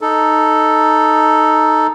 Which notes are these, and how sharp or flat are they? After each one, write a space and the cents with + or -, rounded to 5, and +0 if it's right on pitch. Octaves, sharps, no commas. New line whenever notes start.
D#4 +0 A4 +0